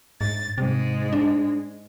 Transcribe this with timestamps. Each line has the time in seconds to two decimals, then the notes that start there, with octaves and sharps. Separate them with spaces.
0.21 G#2 A6
0.58 G#2 C3 G#3
1.13 D4